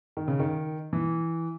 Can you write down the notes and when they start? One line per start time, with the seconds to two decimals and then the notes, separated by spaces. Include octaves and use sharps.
0.17 D#3
0.28 C#3
0.40 D#3
0.93 E3